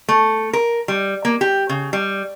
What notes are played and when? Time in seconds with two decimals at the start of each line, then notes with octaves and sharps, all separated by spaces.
0.08 A3
0.53 A#4
0.88 G3
1.25 A#3
1.41 G4
1.69 C#3
1.93 G3